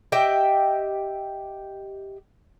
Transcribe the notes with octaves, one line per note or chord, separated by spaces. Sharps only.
G4 D#5 E5 G5